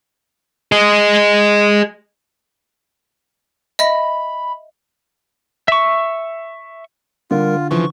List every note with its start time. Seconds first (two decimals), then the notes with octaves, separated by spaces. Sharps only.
0.72 G#4 D#5
3.79 D#5 E5 B5 A#6
5.68 E5 C#6
7.31 D3 G3 F4 A#4
7.71 C#3 E3 F3 C#6